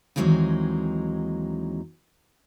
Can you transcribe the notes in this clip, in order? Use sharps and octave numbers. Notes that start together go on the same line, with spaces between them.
D#2 E3 F#3 G#3 C4 D#4